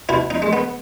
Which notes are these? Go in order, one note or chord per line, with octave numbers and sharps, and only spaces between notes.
B2 E4
D#4
G#3
B3